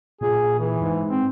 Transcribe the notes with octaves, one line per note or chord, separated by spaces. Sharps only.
A#2 G#4
E3
G#2
C4